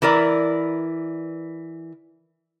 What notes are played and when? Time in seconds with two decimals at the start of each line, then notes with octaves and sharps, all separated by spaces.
0.02 E3 E4 A#4 D5